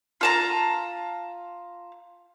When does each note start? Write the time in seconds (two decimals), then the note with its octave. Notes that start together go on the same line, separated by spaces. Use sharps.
0.21 F4 A5 A#5